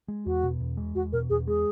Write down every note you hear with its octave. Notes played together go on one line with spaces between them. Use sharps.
G#3
E2 F#4
B2
E2
G#3
E2 F#4
B2 A#4
E2 G#4
G#3 G#4